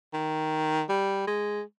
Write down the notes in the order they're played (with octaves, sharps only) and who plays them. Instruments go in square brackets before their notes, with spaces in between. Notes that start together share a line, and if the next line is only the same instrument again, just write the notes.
[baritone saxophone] D#3
G3
G#3